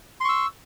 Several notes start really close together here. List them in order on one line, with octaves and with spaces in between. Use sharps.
C6 C#6 E6